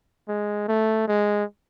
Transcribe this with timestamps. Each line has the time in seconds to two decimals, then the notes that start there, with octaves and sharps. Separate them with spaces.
0.28 G#3
0.68 A3
1.08 G#3